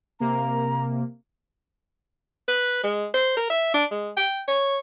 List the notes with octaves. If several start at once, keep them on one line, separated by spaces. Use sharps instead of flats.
C3 A#3 A#5
B4
G#3
C5
A#4
E5
D4
G#3
G5
C#5